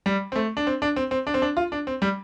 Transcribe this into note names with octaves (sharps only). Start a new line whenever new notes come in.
G3
C4
A3
D4
C4
D4
C4
C4
D4
C4
D4
F4
D4
C4
G3